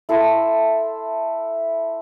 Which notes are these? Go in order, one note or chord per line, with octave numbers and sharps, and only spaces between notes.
E4 A4 C6 E6